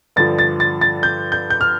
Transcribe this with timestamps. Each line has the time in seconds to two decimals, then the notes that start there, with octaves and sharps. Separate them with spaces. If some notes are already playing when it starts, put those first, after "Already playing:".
0.16 G2 D3 F3 A6
0.39 A6
0.60 A6
0.81 A6
1.03 G6
1.32 G6
1.50 G6
1.61 F6